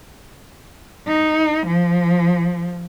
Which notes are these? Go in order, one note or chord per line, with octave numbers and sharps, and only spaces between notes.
D#4
F3